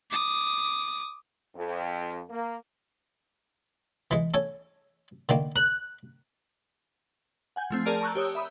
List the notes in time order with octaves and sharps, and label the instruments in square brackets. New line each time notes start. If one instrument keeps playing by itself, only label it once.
[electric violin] D6 D#6
[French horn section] F2
A#3
[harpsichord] E3 G#3
A4 C#5 G#5
D3 D#3 A#3
[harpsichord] A#4 [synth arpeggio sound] F#6
[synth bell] F#5 G#5 G6
F3 A3 C4
G#4 A#4 D5 A5 F6 D7
A5 A#5 C#6 E6 F#6 G6
G4 C#5 D#6 E6
E5 B5 D#6